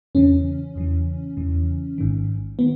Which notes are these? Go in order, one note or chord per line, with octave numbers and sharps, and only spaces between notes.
E2 C#3 E3 C#4
E2 C#3 E3
E2 C#3 E3
A1 G#2 D#3
D#3 B3